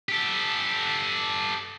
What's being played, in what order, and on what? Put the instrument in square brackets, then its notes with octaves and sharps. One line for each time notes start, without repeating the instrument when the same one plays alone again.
[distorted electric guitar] G4 A4